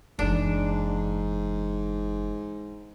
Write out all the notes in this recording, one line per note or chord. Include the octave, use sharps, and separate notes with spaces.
F#1 G#2 E3 D4